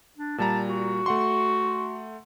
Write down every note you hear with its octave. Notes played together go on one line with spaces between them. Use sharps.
D4
A#2 G3 A5 A#5
F#4
A3 F#5 C6